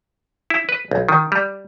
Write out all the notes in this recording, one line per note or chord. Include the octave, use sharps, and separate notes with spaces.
E4
B4
B1
D#3
G3